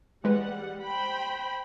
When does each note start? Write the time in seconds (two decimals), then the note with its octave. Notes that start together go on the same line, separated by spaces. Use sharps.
0.24 E3 G3 G#3 B4 F#5
0.84 C5 G5 B5